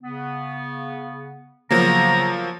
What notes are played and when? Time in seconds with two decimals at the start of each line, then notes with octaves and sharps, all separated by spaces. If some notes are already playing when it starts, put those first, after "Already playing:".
0.02 C#3 B3
1.71 C#3 F3 F#3 A#3 B3 A#5